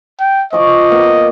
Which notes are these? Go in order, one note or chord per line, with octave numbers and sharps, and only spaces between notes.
G5
F3 D#5 C#6 D6
A#3 B3